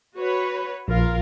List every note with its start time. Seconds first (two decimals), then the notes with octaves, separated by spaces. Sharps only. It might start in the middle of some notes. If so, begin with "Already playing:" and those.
0.16 F#4 B4 C#5
0.88 A#1 F4 A#4 F5